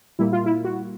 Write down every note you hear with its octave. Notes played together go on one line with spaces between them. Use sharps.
A#2 G3 A#3 E4
F4
E4
F#4